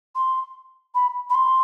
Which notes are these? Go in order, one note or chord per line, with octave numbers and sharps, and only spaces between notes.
C6
B5
B5
C6